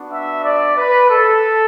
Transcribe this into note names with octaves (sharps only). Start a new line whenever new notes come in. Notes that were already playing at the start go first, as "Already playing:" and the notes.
Already playing: B3 D4 F#4
E5
D5
B4
A4